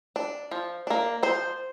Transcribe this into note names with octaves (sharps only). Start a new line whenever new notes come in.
D4
F3
A#3 D4
F3 C5